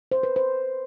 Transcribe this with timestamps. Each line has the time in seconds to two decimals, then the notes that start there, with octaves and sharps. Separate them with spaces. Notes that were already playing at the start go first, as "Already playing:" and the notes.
0.12 C5
0.23 B4
0.36 C5